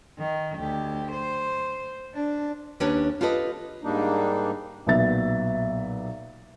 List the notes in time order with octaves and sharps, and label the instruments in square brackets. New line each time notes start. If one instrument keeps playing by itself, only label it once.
[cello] D#3
D2 G4
C5
D4
[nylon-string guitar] D#2 C#4 D4 G4 B4 C#5
F4 G4 A4 B4 D#5
[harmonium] G#2 G3 A#3 D4 D#4
[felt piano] B1 A#2 F#3 B3 E5 A6